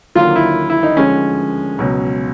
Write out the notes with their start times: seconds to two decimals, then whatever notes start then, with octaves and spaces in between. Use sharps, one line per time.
0.15 D#2 D3 F#3 A#3 F4
0.36 E4
0.70 E4
0.83 D#4
0.96 D2 D3 F3 G#3 C#4
1.78 C#2 B2 F#3